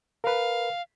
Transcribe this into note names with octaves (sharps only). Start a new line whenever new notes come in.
A#4 B4 F5